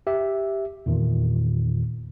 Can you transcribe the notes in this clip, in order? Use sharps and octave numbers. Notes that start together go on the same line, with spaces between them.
G4 E5
E2 A#2 D#3